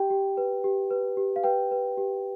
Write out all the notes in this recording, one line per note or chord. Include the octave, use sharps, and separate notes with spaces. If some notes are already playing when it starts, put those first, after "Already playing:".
Already playing: G4 G5
G4
B4
G4
B4
G4
F5
B4 G5
B4
G4